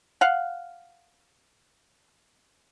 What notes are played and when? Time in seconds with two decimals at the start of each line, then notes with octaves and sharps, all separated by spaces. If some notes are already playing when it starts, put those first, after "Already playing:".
0.21 F5 F#5